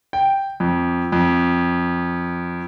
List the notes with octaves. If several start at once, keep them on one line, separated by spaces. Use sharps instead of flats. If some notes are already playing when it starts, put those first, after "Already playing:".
G5
F2
F2